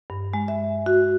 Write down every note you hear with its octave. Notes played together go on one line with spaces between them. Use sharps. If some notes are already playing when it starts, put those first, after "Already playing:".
G2
G#3
E5
F#4